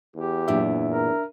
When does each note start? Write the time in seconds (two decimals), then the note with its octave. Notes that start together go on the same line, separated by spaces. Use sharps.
0.16 E2 G4
0.48 F#2 A#2 D4 E5
0.88 A#4